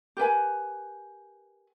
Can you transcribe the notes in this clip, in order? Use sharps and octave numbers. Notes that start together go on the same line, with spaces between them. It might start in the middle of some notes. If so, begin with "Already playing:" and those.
G4 A#4 B4 G#5